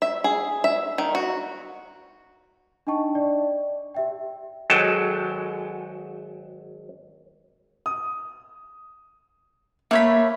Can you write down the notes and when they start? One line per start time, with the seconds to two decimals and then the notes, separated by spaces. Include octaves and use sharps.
0.02 E5
0.24 G#4
0.64 E5
0.98 D#3
1.15 F#4
2.87 D4 D#4 D#5 G5 A5 C#6
3.15 D5
3.95 G4 E5 G5
4.70 G#1 F#3 G#3 A4 G5 A5
7.86 D#6
9.91 A3 A#3 C#5 B5